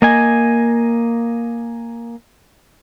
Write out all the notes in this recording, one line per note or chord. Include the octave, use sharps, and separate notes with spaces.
A#3 D#5 G#5